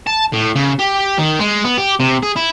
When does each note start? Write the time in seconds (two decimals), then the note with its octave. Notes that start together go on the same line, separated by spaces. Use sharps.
0.07 A5
0.33 A2
0.56 C#3
0.79 G4
1.18 D#3
1.39 G#3
1.64 B3
1.78 G4
2.00 C3
2.23 G#4
2.36 E4